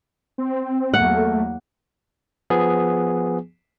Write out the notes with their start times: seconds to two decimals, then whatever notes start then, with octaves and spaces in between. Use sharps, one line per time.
0.38 C4
0.94 E2 F#3 A3 A#3 F#5
2.50 F3 B3 G#4